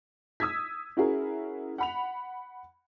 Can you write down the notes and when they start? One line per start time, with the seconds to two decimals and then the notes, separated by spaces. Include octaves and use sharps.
0.40 D#6 E6 G#6 B6
0.97 C#4 E4 F#4 G#4 A#4
1.78 F#5 B5 F7